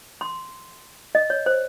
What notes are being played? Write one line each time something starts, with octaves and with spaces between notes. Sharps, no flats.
C6
D#5
C#5
C5